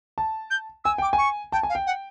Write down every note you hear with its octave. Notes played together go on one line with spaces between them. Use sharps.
A5
G6
G#5 E6
G5 D6
G#5
C#6
G5 A5
G#5
F5
G5
F#5